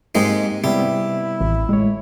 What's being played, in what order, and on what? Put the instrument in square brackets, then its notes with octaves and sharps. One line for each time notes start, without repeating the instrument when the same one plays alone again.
[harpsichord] G#2 G#3 D#4 [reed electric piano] A#3 C4 G4
[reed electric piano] C3 G3 B3 [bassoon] E4 [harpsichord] G4
[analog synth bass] A1
[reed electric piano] A2 C#5 [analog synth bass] G#3